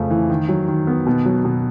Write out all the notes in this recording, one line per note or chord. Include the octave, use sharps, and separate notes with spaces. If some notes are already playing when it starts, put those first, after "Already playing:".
Already playing: F2 C#3 A3
E3
D#3
F#3
D#3
B3
B2
F#3
B2